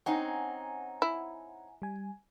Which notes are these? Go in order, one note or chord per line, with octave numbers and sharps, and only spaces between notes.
C4 C#4 D#4 F#5 G#5 A#5
E4
G3 G#5